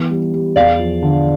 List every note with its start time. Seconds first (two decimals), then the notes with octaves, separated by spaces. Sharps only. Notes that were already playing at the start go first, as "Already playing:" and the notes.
Already playing: E3 B3
0.10 G3
0.34 G3
0.56 E2 D5 F5
0.79 F3
1.02 D3